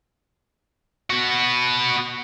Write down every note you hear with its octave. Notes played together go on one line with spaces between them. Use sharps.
B3 F#4